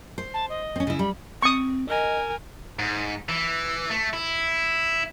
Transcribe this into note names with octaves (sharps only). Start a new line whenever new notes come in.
C5
A5
D#5
C4 C#4
C#3 E4
G3 B5
C4 C#6 D#6
A#4 D#5 G#5
G#2
E3
A3
E4